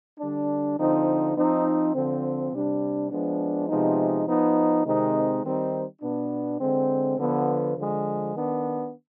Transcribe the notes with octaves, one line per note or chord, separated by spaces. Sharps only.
D3 G3 D4
D3 F3 C4 D#4
F3 C4 D#4
D3 F3 C4
C3 G3 D4
F3 G#3 B3 D4
C3 F3 G#3 B3 D#4
F3 B3 D#4
C3 D#3 G#3 C4 D#4
D#3 G3 C4 D#4
B2 B3 D4
D3 G#3 C4
D3 F3 B3
D3 F3 G#3
D#3 B3 D4